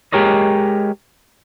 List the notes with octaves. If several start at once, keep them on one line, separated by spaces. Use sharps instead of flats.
G#3 G4 A#4 C#5 D#5